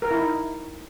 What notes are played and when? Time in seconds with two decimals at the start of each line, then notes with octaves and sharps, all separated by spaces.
0.02 A#4
0.11 E4
0.19 D#4